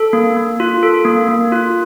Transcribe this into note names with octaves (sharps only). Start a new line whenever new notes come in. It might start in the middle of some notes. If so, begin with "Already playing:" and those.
Already playing: A4
A#3
A#3
F4
A4
A#3
A#3
F4